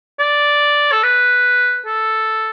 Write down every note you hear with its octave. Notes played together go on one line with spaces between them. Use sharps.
D5
A4
B4
A4